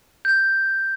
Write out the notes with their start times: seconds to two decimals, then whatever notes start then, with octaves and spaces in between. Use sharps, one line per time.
0.25 G6